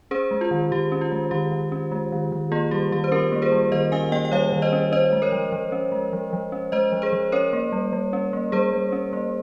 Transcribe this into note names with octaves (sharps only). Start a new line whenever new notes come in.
C#4 G#4 C5
G#3
F4
D#3
D#3 G4
C#4
F4
G#3
D#3 G4
D#3
C#4
G#3
D#3
D#3
A#3 F4 G#4
G3 G4
D#3 G4
C5
C#4 G4 A#4
A#3
G#4 C5
G3
D#3 C5 D#5
C#4 F5 G#5
A#3 D#5 G5
G5
G3 C#5 F5
D#3
C5 D#5
C#4
C#4 C5 D#5
G#3
A#4 C#5
F3
F3
C#4
G#3
F3
F3
C#4
G#3 C5 D#5
F3
G#4 C5
F3
C#4 A#4 C#5
A#3
G3
G3
C#4
A#3
G3 G#4 C5
G3
C#4
A#3